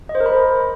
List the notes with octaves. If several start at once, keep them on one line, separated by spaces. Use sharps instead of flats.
D#5
C5
A#4
B5